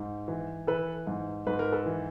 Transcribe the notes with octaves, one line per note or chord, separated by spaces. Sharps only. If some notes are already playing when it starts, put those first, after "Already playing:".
Already playing: G#2
E3
E3 A4 B4
G#2
G#2 B4
A#4
A4 B4
E3